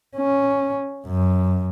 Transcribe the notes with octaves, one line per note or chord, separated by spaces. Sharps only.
C#4
F#2